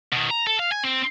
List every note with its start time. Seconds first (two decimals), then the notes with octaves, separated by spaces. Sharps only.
0.13 B2 D#3
0.31 A#5
0.47 A4
0.59 F5
0.72 G#5
0.83 C4